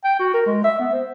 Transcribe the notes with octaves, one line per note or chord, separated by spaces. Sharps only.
G5
F#4
A#4
G#3
E5
B3
C5